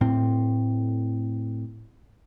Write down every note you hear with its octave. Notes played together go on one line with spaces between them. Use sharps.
A2 C4